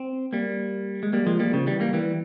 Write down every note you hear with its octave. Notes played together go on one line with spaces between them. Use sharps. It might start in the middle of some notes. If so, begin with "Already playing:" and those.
Already playing: C4
G3 A#3
G#3
G3 A#3
F3 G#3
G3 A#3
C#3 F3
E3 G3
G3 A#3
E3 G3